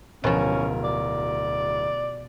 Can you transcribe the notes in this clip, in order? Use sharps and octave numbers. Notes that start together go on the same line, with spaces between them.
D1 B2 F3 C#4 A#4
D5